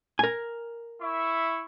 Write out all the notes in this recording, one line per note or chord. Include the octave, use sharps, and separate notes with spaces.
A#4 G#5
E4 E5 C#6